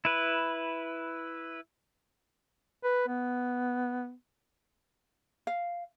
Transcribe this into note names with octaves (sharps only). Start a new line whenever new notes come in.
E4 B4
B4
B3
F5